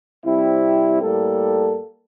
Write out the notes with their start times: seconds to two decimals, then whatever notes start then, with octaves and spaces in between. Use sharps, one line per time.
0.24 C3 G3 C4 E4
1.01 A2 G3 A#3 A4